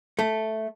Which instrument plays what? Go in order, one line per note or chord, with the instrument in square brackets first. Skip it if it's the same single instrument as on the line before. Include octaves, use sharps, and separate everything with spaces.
[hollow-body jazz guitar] A3